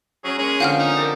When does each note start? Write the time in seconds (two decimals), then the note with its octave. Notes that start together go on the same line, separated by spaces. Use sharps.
0.25 F#3 C#4 G#4
0.38 G#3 A#3 C#4 G#4
0.60 D3 F3 C4 F5 F#5 F6
0.79 D#4
0.97 G4 A4 A#4